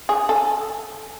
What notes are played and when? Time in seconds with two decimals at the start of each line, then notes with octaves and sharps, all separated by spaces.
0.09 G#4
0.29 A4